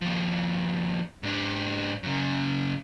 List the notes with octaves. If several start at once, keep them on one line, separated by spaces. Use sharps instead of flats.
D#2 F3
G#2 D4
F#2 C#3